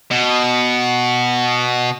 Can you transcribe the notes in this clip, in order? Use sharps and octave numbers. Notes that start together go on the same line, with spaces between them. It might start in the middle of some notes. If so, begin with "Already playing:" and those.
B2